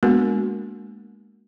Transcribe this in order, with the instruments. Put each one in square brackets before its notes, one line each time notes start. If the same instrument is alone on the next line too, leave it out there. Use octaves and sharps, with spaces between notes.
[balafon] G#3 A#3 B3 D4 F#4 A#4